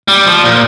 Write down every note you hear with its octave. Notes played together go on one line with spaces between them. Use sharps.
G3
F3
A#2